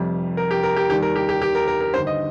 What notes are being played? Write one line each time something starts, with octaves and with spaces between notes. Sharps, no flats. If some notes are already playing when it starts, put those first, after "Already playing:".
Already playing: F1 F2 C3 G3
A#4
G4
A#4
G4
D#2 D#3 G3 G4
A#4
G4
G4
G4
A#4
A#4
A#4
G1 G2 D#3 C5
D#5